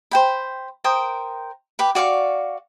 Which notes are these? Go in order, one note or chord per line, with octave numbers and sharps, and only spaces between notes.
C5 G5 B5
A#4 C5 G5 D#6
G4 B4 B5
F#4 D5 F5 C#6